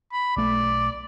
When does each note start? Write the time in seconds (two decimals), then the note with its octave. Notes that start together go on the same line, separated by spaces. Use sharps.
0.13 B5
0.37 B1 A3 D5